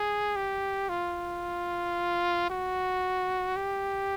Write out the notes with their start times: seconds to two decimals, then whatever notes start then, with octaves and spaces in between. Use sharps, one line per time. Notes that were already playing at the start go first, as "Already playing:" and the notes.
Already playing: G#4
0.36 G4
0.89 F4
2.50 F#4
3.56 G4